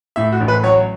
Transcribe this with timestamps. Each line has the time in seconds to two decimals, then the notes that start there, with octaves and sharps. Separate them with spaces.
0.16 A2 E5
0.32 F#4
0.40 A1
0.48 B4
0.63 F#3 C#5